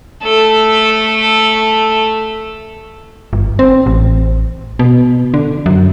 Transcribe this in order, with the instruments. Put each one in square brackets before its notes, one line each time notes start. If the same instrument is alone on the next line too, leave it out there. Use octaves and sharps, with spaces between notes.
[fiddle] A3 A4
[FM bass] G1
C4
A1
B2
D3
F#2